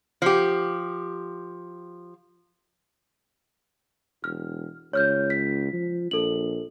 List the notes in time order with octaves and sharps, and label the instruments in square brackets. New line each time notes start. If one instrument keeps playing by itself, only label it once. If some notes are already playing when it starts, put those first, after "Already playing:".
[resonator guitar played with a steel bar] F3 G4
[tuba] E1 [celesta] F6
[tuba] C#2 [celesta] C#5 F6 G6
[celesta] B6
[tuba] F3
[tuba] A#1 [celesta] A4 F#7